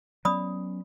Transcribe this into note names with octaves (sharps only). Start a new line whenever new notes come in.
F#3 B3 C#4 D5 B5 D#6